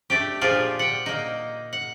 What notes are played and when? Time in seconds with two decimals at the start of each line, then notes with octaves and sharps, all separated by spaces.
0.10 A3 D4 G4
0.41 A#2 F3 D4 F4 G4 G#4
0.79 F#5 G5
1.06 A#3 D#4
1.73 F#5